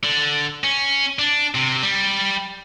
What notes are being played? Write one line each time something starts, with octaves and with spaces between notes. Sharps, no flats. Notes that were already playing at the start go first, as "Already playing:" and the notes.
D3
C#4
D4
C3
G3